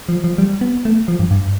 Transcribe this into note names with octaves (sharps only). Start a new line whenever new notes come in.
F3
F3
G3
B3
A3
F3
G2
G2